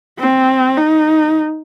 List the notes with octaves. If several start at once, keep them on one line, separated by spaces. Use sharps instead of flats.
C4
D#4